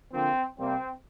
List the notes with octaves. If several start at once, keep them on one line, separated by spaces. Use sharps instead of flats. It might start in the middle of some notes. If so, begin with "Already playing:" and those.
D3 F3 A#3 C4
C3 G3 A#3 C4